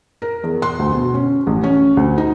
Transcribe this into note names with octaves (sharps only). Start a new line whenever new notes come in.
A#4
E2
C6
D2
B2
C#4
A1
C#4
D2
D#4